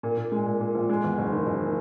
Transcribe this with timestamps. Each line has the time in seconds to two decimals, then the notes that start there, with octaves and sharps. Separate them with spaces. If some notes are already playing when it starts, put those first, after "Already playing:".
0.03 A#2
0.17 A#2
0.32 G#3
0.46 A#2
0.60 A#2
0.75 A#1
0.89 G#3
1.04 E2
1.18 F#1
1.32 D#3
1.47 F#1
1.61 D#3